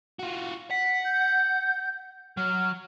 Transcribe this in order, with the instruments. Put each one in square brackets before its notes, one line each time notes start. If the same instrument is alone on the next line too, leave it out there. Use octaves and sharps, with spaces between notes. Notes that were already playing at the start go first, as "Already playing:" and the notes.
[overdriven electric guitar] F4 F#4
[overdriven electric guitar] F#5 [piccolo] B6
[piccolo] G6
[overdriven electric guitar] F#3 [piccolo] F6